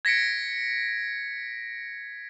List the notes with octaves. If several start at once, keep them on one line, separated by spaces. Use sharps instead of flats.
G#6 A#6 B6 C#7 D7